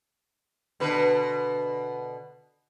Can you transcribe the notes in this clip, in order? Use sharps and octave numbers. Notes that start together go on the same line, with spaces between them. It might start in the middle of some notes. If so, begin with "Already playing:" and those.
B2 D3 B4